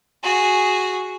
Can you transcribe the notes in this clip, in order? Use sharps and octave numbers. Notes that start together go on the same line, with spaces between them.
F#4 G#4